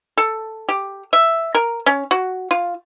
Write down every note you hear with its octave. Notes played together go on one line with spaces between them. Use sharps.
A4
G4
E5
A#4
C#4
F#4
F4